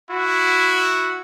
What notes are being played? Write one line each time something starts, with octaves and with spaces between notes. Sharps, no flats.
E4 F#4